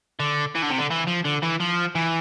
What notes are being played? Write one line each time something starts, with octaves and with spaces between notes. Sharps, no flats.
D3
E3
D3
C3
D3
E3
F3
D3
E3
F3
E3